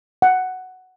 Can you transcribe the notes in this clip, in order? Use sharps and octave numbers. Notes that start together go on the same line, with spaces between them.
F#5